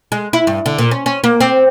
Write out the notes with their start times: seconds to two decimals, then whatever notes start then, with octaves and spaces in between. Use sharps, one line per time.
0.12 G#3
0.33 E4
0.47 G2
0.66 D3
0.78 A#2
0.91 C#4
1.06 C#4
1.24 A#3
1.41 C4